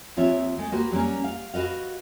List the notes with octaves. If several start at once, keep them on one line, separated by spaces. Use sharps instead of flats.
D#2 F3 C4 F4 C#5 E5
G#3 A3
A#3 F#4 G4 B4 C5
F#3 G3 A#3 C#4
F5
F#4 B4 D#5 F5